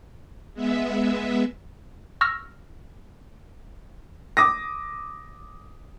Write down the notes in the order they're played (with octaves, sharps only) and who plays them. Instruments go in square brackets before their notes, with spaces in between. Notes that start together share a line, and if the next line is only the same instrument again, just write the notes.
[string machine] G#3 B3 E5
[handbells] C#6 E6 F6 A#6
[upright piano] D6 D#6 A#6